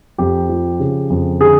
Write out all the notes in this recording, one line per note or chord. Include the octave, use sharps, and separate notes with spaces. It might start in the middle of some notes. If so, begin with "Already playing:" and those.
F2 G4
F3
C#3
F2
D3 G#4